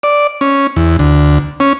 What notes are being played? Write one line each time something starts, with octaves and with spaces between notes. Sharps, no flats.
D5
C#4
E2
D2
C#4